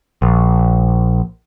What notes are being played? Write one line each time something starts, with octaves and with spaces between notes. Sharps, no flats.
A#1